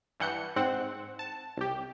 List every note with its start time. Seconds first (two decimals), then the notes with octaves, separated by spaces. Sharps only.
0.20 G2 E3 F#5 G6 C#7
0.56 G#2 C4 F#5
1.19 A5
1.57 C2 G4